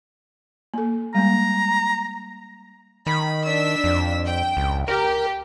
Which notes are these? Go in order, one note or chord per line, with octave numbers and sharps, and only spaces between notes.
A#3 A4
G3 G#3 A#3 A#5
D#3 B5
D4 E6 B6
F2
G5
C#2
G4 A#4